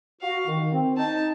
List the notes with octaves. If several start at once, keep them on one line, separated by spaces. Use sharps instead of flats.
F#4 F5
D#3
C4
D#4 A5